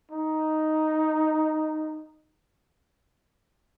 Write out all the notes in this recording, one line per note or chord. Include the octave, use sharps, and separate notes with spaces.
D#4